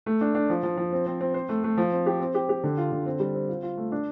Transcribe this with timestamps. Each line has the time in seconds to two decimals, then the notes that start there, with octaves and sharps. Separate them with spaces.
0.06 A3
0.21 D4
0.35 D4
0.50 F3
0.63 F3
0.77 F3
0.93 C4
1.06 C4
1.21 C4
1.34 C5
1.49 A3
1.64 A3
1.77 F3
1.92 C4
2.06 G4
2.20 C4
2.34 G4
2.49 G4
2.64 D3
2.78 F4
2.92 D3
3.06 C4
3.20 G3
3.34 C4
3.49 F4
3.63 F4
3.77 A3
3.92 D4